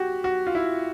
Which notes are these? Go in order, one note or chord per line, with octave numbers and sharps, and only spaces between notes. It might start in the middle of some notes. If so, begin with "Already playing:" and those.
Already playing: F#4 G4
F#4
F4
E4